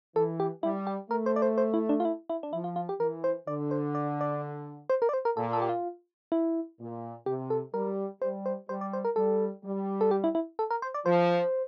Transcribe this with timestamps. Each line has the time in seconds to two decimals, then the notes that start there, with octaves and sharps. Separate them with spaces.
0.16 E3 A4
0.40 G4
0.63 G3 E4
0.87 G4
1.10 A3 A#4
1.26 C5
1.36 D5
1.42 C5
1.58 C5
1.74 E4
1.89 D4
2.00 F4
2.05 E4
2.30 E4
2.43 D4
2.53 F3 E4
2.64 F4
2.76 F4
2.89 G4
3.00 E3 A#4
3.24 C5
3.47 D3 D5
3.71 C5
3.95 D5
4.21 D5
4.90 C5
5.02 A#4
5.09 D5
5.14 C5
5.25 A#4
5.37 A#2 A4
5.53 A4
5.62 G4
5.69 F4
6.32 E4
6.80 A#2
7.26 C3 G4
7.50 A4
7.74 G3 A#4
8.22 G3 C5
8.46 C5
8.69 G3 C5
8.81 D5
8.93 C5
9.05 A#4
9.16 G3 A4
9.64 G3
10.01 A4
10.11 G4
10.24 E4
10.35 E4
10.59 A4
10.71 A#4
10.82 C5
10.94 D5
11.06 F3 C5